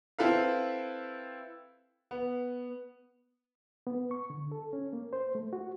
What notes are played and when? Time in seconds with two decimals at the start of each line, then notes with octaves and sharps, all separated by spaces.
0.19 C4 E4 A4 B4 F5
2.11 B3
3.87 B3
4.11 C#6
4.30 D3
4.52 A4
4.73 C#4
4.93 A#3
5.13 C5
5.35 A3
5.53 F#4